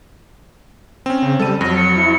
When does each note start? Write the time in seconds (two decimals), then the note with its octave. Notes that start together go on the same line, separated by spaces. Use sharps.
1.06 C4 C#4
1.22 C#3
1.40 G3 A4 D#7
1.61 F2 F#3 A#6
1.76 C#7
1.96 E4